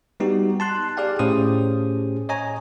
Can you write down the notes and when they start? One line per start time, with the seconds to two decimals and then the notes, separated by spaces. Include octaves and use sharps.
0.20 G3 B3 D#4 F#4 G4
0.60 A5 C6 F#6
0.97 G4 G#4 D5 F5 G5
1.19 A2 C#4 G4 G#4 C5 D#6
2.29 C#5 D#5 G#5 A#5